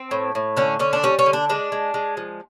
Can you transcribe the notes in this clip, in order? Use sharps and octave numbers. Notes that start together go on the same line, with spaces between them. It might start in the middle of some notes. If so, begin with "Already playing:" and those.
Already playing: C4
A2
A2
D3 C#4
D3 C#4
D4
G3 C#4
C#4
D3
D4
G#3 D4
G#3
G#3
F3